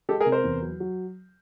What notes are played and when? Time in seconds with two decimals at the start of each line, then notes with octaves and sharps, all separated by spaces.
0.09 G#3 G4 A4
0.20 G#4 A#4
0.26 C3
0.32 A#4 C5
0.44 E2
0.62 F#3
0.80 F#3